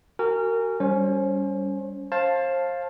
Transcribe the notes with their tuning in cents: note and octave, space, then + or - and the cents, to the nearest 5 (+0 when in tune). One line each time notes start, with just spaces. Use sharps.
F#4 +25 A#4 -25 G#5 -15
G3 +0 C#4 +20 C5 +35
C5 +35 F5 +0 A5 +0